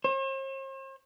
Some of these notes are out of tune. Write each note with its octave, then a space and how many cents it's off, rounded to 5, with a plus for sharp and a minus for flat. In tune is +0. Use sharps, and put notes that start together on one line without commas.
C5 +45